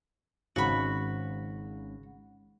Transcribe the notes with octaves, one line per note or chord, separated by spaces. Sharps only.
G#1 G#2 C#3 F#4 B5